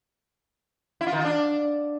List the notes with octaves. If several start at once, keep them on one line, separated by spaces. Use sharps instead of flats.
E4
F4
D#3
F4
D4